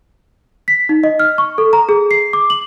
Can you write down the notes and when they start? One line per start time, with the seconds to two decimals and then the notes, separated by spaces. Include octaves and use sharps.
0.68 B6
0.89 D#4
1.04 D#5
1.20 F6
1.38 C#6
1.58 A4
1.73 A#5
1.89 G#4
2.11 C7
2.33 D6
2.50 F#7